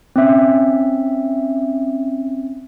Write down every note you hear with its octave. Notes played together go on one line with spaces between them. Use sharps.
C4 C#4 E5